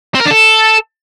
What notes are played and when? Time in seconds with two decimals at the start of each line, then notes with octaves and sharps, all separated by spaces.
0.15 C4
0.20 A#4
0.25 D4
0.31 A4